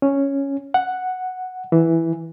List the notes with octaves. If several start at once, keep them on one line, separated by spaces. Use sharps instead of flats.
C#4
F#5
E3